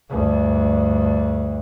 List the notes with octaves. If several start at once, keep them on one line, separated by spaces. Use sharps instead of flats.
D2 G2